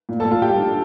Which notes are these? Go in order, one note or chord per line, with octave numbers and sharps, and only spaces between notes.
A#2
A#2 A4 A5
F4 F5
G3 G4 G5
D4